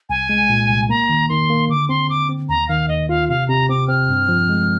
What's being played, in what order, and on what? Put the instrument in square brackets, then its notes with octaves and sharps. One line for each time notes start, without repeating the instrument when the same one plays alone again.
[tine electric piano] C2 [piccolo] G#5
[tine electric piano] G#3
A#2
C2
[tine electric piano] A#3 [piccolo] A#5
[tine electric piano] D#3
[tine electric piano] D#3 [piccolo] C6
[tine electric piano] A#3
[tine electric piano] D3 [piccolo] D6
[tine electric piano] C4 [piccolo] C6
[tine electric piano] C4 [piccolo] D6
[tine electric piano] C4
[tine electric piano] D#2 [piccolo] A#5
[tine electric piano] D#3 [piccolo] F5
[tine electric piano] D#2 [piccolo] D#5
[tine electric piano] F4 [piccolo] F5
[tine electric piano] C3 [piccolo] F5
[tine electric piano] C3 [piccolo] A#5
[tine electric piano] C4 [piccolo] D6
[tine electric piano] C4 [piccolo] F6
[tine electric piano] G2
F3
G#3